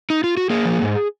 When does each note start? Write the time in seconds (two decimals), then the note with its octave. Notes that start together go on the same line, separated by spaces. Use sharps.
0.10 D#4
0.24 F4
0.37 F#4
0.50 A#3 G#4
0.65 F3
0.82 G#2